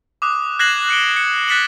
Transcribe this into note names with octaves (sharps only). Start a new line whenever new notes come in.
D6 D#6 F#6
F#6 G#6 A#6 C7 E7 F#7
F#6 C#7 D7 G7
C#7
F#6 A6 B6 C#7 E7 F#7